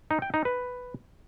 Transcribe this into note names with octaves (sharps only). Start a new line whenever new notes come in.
D#4
G5
D#4
B4